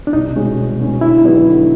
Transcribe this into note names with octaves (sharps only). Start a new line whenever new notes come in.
D4
C2 D#4
B2 G#3 C#4
C2
B2 G#3 C#4
D3 E4
F#3 B3 D#4 G4
D3